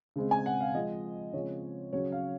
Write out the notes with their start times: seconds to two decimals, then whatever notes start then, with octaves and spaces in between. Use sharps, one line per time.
0.16 C#3 G#3 C4
0.31 G#5
0.46 F#5
0.61 F5
0.74 F3 G#3 C4 D#5
1.33 C#3 F3 G#3 C4 C#5
1.93 C#3 F#3 C#4 C#5
2.12 F5